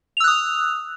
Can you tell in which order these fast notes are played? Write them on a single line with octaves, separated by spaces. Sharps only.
F7 E6 F#6 D#6